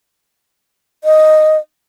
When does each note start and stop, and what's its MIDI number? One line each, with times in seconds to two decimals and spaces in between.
1.04 1.58 75